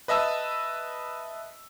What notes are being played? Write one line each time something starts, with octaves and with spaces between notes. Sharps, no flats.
B4 D#5 E5 A5 E6